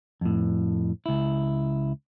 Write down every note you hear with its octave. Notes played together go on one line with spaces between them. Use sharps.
F2 A2
C#2 E4